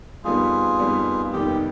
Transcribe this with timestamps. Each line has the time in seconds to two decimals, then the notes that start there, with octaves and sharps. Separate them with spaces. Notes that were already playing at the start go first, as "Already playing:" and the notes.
0.24 F2 D#3 G3 B3 F4 G#4
0.79 F2 D#3 G3 B3
1.33 F1 D#2 D#3 G3 B3 G4